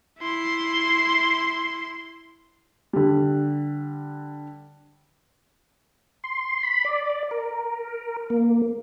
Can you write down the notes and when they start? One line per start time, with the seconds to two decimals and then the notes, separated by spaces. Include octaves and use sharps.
0.19 E4 C6
2.93 D3 G3
6.24 C6
6.63 B5
6.85 D5
7.31 A#4
8.30 A#3